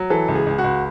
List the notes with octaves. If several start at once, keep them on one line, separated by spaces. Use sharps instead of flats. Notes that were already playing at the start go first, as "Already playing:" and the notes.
Already playing: F#3
E3 A4
C#2
G#4
C#2
F#4
C#2